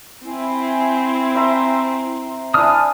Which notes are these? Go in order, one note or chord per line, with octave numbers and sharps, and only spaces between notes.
C4 E4 G#5
C5 E5 A#5
D4 E4 D5 G#5 D#6 F6